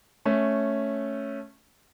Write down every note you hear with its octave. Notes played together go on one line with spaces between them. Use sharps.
A3 C#4